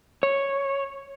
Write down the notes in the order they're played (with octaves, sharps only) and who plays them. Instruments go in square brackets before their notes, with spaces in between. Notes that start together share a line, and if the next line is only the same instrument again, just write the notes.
[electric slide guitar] C#5